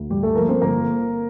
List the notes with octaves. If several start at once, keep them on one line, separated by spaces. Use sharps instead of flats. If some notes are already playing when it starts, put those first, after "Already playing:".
Already playing: D2
G2 G3 G4
A3 A4
F3 A#3 A#4
C4 C5
G1 A#3 A#4